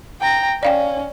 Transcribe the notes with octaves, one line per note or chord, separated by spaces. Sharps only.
G5 A#5
C#4 D5 F5 G5